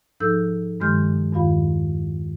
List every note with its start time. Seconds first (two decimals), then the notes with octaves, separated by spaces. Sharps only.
0.20 G#2 F3 D#4 A4 E6 G6
0.80 G2 D#3 G#3 C6 F6 G6
1.32 E2 G2 D#3 F4 F5 B5